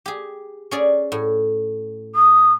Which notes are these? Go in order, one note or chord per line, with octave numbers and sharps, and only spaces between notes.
G4 G#4
C#4 G#4 D5
A2
D#6